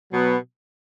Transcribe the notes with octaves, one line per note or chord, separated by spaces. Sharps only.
B2 F#3 B3